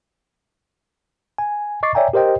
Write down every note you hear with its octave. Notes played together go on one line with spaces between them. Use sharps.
G#5
D#5 C#6 D6 A6 C7
C#5 D5 E5 G5 G#5 A#5
G4 A#4 C5 D#5 G5